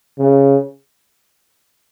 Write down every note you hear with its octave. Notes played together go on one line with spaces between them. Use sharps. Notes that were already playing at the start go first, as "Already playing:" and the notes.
C#3